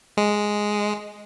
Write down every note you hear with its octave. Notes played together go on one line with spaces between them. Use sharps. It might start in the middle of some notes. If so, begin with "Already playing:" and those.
G#3